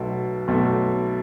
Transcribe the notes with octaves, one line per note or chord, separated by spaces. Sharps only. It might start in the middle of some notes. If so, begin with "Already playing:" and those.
Already playing: B1 B2 A3
B1 B2 A3